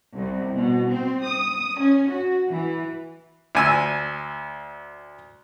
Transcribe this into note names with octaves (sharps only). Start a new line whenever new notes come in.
C2
B2
C4
D#6
C#4
F#4
E3
D2 G#5 E6